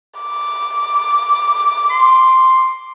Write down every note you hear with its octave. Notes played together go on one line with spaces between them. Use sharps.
D6
C6